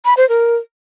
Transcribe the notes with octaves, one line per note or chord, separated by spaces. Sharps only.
B5
C5
A#4